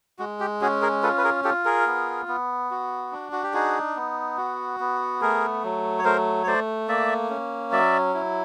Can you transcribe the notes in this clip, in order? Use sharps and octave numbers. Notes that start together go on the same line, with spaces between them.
G#3 F#4
G4
C#4 F#4 G#4
G#4 A#4
F4 A4 B4
B4
G#4 A#4
F4 G4 A4
G#4 A#4
B3
B3
F#4
D4
F#4
G4
D#4 F#4 G#4
B3
F#4
B3
A3 G#4 A#4
F#3
C#5
A3 A#4 C5
C#5
A3 C5 D5
A#3 D5 E5
C#4
F#3 D5 E5
E4